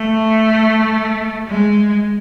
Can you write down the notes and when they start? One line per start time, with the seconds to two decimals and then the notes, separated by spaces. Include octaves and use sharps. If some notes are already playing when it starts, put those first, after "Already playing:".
Already playing: A3
1.47 G#3